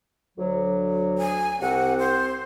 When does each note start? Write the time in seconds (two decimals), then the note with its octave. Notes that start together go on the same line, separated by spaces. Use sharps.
0.38 D2 F#3
1.18 G#5
1.61 C2 C3 C4 F#5
1.99 C5